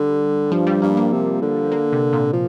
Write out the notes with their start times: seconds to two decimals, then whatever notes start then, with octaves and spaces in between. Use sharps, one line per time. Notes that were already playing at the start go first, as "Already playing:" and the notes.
Already playing: D3 G3
0.52 G2 F3
0.67 G3
0.82 G2 A#3
0.97 A#3
1.12 C3
1.42 D3
1.72 A#3
1.93 C3
2.13 A#2
2.33 F3